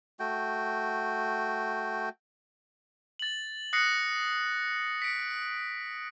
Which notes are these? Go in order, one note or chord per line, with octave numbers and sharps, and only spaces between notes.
A3 F#4 G5
A6 F#7
D#6 F#6 A#6 C7 C#7
B6 C#7 D7